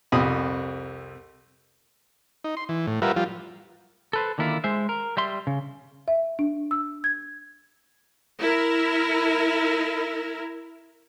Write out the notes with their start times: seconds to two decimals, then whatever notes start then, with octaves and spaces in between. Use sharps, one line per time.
0.12 C2 F2 G4 B5 D#6
2.44 D#4
2.57 C6
2.69 E3
2.87 A2
3.02 G3 F4 A#4 B4 E5 F#5
3.16 F3 G3 F4
4.13 A4 B4 C5
4.38 D3 D#3 A#3 E4 F4
4.64 G#3 C5 E5
4.89 A#4
5.17 G3 E5 C6
5.47 C#3
6.08 E5
6.39 D4
6.71 E6
7.04 G#6
8.39 E4 A#4